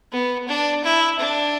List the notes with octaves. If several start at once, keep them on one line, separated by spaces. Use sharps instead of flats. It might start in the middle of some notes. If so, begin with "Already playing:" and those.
B3
D4
E4
D4